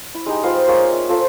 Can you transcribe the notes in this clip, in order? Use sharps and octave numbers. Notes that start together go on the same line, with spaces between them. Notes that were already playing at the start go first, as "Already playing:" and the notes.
E4
G#3 D#4 G4
F4 B4 C5 F5
A#3 G#4 C#5 F5
E5
F4 A4 C5